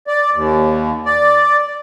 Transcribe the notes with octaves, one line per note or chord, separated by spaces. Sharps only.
D5
D#2
D5